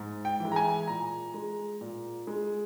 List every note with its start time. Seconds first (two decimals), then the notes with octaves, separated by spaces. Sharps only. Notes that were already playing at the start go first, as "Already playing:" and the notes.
Already playing: G#2
0.25 G5
0.40 E3 G#3
0.52 A#5
0.56 G#5
0.88 A#2 A#5
1.34 G#3
1.81 A#2
2.27 G#3